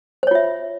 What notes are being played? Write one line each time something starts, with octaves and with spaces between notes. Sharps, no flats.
F4 C5 C#5 E5